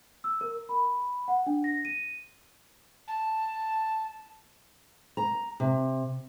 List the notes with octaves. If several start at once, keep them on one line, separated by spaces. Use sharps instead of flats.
E6
A#4
B5
F#5
D4
A#6
D#7
A5
A#5
C3